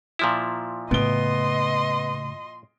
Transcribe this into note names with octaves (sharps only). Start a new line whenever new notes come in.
A#2 F3 E4
A2 C#3 B3 D#5 C6 D7 G7